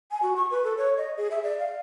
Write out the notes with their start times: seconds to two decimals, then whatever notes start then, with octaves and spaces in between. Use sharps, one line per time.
0.11 G#5
0.22 F#4
0.36 C#6
0.50 B4
0.64 A4
0.77 C#5
0.97 D#5
1.17 G#4
1.31 E5
1.43 D5
1.59 F5